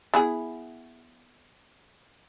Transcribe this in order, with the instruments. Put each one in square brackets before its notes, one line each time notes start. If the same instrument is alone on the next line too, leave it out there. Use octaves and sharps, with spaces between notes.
[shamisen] B3 E4 G#4